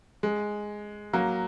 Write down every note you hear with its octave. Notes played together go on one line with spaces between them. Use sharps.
G#3
F#3 A#3